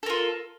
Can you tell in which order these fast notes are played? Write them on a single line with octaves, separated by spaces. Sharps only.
A4 A#4 F4